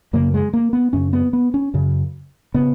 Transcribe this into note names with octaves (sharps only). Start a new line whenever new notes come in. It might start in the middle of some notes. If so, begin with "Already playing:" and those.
F#2 C#3 A#3
G#3
A#3
B3
F#2 C#3 C#4
B3
B3
C#4
F#2 C#3
C#3 B3